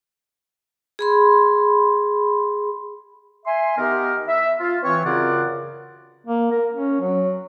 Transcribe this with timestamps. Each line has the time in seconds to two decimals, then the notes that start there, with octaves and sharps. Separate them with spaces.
0.99 G#4 B5 C6
3.46 E5 G#5 C6
3.78 D#3 B3 G4 A#4
4.28 E5
4.60 F4
4.83 E3 C4 C#5
5.05 F#2 C#3 F4 A#4 D5 F#5
6.25 A#3
6.51 A#4
6.73 C#4
7.01 F#3